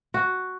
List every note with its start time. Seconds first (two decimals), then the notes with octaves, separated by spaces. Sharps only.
0.14 F#4